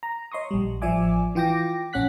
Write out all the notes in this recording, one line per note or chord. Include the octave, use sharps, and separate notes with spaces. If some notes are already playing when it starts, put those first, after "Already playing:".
A#5
C#5 D#5 C6 C#6 D#6
A#1 G3
A1 F3 D5 E5 G#5 D6
E3 F4 G5 D6 A#6
A#1 C#4 F#5 F#6 B6